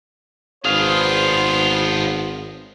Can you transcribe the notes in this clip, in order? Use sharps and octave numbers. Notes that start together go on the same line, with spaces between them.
G#1 B3 D4 F4 G#4 C5 F5